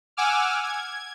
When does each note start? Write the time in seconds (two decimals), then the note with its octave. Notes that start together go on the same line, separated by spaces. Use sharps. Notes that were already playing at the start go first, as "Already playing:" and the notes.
0.17 F#5 G#5 D6 E6 F6
0.64 G#6